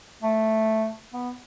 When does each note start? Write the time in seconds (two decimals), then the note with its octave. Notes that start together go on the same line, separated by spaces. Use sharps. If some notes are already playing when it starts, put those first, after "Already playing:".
0.23 A3
1.13 B3